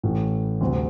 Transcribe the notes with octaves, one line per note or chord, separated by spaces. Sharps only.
A1 A2 E3
D2 C3 G3 C4